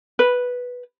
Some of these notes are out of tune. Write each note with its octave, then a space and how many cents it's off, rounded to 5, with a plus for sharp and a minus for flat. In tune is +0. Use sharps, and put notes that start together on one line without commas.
B4 -5